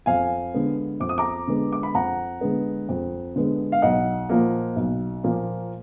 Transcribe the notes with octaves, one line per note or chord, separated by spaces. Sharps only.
F2 F5 G#5
D3 G#3 B3
F2 D6
D#6
A#5 D6
D3 G#3 B3
D6
B5
F2 F#5 A#5
D3 G#3 B3
F2
D3 G#3 B3
F5
B1 D#5 F#5
A#2 F3 A#3
B1
A#2 F3 A#3